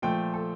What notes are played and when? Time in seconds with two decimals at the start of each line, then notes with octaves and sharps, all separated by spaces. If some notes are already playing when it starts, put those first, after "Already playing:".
0.02 A#2 F3 A3 G5
0.34 A4